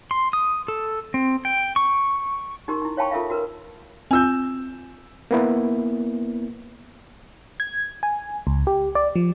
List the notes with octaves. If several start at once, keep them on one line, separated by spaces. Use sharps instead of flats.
C6
D#6
A4
C4
G5
C#6
D#4 G4 A#4 C6
D#4 E4
C#5 F5 G5 A5 B5 C#6
F4 A4 A#4 E5 F5
F#4 A#4 B4
C4 F4 G#5 E6 G6
A#3 B3 E4
G#6
G#5
C#2
G4
D5
F3